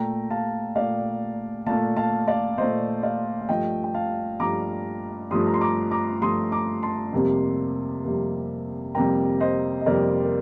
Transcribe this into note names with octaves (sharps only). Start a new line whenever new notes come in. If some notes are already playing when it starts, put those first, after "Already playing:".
Already playing: A#2 A3 G5 A#5
F5 A5
A#2 A3 D5 F5
A#2 A3 F5 A5
F5 A5
D5 F5
A#2 A3 C5 D#5
D5 F5
F5
G2 F3 A3 D#5 G5
G5
F5 A5
G2 F3 A3 A#5 D6
G2 F3 A3 C6 D#6
A#5
C6
A#5 D6
A#5 D6
G2 F3 A3 C6 D#6
A#5 D6
A5 C6
F2 C3 G3 A#3
F2 C3 G3 A#3
F2 C3 G3 A#3 G5 A#5
C5 D#5
D#5
F2 C3 G3 A#3 A#4 D5
A#4